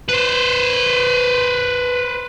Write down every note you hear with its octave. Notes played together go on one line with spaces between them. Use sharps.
B4 C5